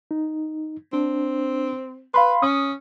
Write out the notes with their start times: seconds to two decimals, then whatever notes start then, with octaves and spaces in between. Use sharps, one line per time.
0.11 D#4
0.93 C4 D4
2.14 B4 F5 B5 C6
2.42 C#4 D#6